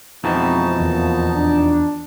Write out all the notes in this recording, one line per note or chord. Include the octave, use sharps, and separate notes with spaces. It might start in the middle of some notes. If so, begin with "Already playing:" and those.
F2 B2 E3 G#3 C4 D#4 A5
E2 F3 A#3
D4